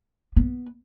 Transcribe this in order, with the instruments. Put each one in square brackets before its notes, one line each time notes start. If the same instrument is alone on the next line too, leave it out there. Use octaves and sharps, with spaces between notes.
[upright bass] B3